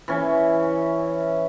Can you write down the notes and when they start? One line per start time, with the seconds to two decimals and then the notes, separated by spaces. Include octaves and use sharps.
0.08 E3 C#4